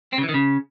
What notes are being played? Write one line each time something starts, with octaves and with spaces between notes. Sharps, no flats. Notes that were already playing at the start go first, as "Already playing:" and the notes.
C4
C#3
E3
D#3
C#3